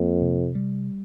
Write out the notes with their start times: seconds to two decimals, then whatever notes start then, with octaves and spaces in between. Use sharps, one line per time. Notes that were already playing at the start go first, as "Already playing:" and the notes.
Already playing: F2 A#3
0.22 C3
0.55 G3